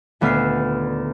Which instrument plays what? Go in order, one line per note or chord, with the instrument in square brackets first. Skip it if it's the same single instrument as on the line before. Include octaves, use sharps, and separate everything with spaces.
[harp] D#1 D2 B3 E6 F6 C7